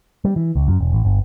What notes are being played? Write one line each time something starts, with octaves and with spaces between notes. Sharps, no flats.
G3
E3
C#2
F#2
E1
A1
G1